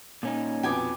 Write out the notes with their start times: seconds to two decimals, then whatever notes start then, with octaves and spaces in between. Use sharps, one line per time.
0.23 A#2 C#4 D#4
0.63 F2 B2 B3 G5 G#5 D6